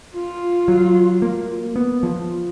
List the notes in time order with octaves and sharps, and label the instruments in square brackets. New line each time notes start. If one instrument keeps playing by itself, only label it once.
[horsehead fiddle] F4
[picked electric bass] F#3
A#3
B3
F3